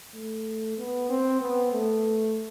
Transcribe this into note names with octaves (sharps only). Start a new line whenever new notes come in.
A3
B3
C4
B3
A3